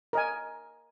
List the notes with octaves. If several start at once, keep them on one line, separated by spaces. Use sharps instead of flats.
A#4 D#5 G#5